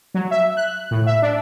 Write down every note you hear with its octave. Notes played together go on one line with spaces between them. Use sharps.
F#3
E5
F#6
A2
E5
D4